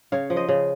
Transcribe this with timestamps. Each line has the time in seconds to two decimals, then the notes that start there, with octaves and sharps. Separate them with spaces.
0.12 C#3 C#5 F5
0.30 F3
0.36 C5 D#5
0.49 C#3